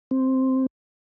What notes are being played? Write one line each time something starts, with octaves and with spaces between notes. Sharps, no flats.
C4